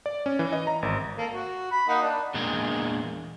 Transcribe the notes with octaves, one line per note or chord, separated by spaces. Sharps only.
D5
C#4
E3
D#5
A#5
G#1
A#3 A4
F#4
B5
A#3 D#4 F#5
D4
E2 A#2 G#3 D4 A#4 D#5